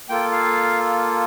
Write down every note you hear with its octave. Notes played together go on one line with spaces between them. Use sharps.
A#3 F4 A4 G5
F5